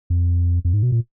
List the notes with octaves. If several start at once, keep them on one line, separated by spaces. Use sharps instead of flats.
F2
F2
G#2
B2
A#2